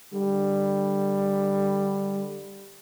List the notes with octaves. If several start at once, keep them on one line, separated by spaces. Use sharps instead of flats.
D3 G3